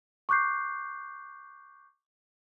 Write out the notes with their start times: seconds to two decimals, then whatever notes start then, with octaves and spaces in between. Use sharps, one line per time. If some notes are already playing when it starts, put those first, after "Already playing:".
0.29 C#6 D6 F#6 G6 C7